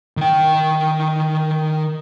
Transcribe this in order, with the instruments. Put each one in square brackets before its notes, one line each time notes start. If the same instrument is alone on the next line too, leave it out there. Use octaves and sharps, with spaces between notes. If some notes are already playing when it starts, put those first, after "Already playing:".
[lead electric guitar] D#3 G5